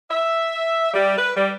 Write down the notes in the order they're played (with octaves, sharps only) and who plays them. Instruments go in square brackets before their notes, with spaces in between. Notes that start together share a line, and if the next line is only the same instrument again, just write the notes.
[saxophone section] E5
G3
B4
G3